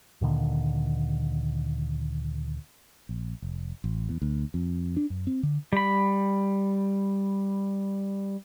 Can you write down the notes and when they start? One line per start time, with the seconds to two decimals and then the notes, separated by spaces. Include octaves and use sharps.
0.21 D2 A#2 D3 D#3
3.09 A#1
3.42 F1
3.84 A1
4.09 E2
4.22 D2
4.54 F2
4.97 D4
5.10 F#2
5.27 C4
5.43 D3
5.73 G3 B5